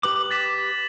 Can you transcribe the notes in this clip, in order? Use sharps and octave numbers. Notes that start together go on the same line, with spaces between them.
G4 B4 D6 F#7
A6 B6 E7